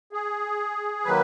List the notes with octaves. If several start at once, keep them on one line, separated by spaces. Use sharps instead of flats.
G#4
D#3 F#3 A#3 B4